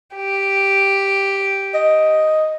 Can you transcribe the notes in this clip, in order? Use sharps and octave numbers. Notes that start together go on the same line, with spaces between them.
G4
D#5